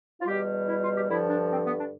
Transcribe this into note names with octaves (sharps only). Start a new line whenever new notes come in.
F4
E2 B2 G3 G4
E4
F4
G4
G2 D3 F3 E4
D4
C4
B3
D4